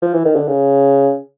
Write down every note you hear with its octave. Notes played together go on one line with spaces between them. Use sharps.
F3
E3
D#3
D3
C#3